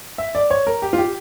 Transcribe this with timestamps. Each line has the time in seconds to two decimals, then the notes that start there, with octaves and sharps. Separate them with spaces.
0.18 E5
0.35 D5
0.50 C#5
0.67 A#4
0.82 G4
0.93 F4
0.98 G4